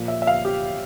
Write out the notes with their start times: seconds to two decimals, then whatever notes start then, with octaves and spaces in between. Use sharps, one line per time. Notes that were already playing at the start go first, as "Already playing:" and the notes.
Already playing: A#2 F3
0.08 E5
0.22 E5
0.27 F5
0.45 G4